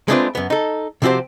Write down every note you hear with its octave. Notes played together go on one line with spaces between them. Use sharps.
G#3 A3 C4 D4 F4 B4
F#2 B3
D#4 A4
C3 F3 C4 F#4 G4 C5